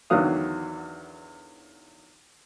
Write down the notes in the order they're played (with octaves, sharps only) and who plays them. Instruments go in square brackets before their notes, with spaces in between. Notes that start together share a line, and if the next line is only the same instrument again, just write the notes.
[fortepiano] E2 D3 D#3 F#3 F5 D#6